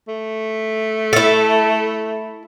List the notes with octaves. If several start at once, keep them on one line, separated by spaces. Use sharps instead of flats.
A3
E4 A4